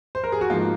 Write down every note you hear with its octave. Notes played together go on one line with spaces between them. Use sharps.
C5
A#4
G#4
F#4
G#2 F3 A#3 F4